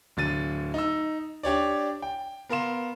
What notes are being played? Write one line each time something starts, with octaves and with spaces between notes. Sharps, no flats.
D1 D3 A6 D#7
D#4 E6
D4 G4 C#5 D5
G5
B3 A#4 F5 C6 E7